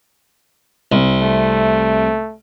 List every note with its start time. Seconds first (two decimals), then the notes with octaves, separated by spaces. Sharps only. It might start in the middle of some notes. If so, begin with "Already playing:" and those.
0.92 C2
1.21 A3